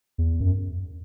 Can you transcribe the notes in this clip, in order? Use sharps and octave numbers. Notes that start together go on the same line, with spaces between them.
E2
F#2